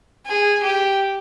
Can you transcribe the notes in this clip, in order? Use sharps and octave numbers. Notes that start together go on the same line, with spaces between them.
G#4
G4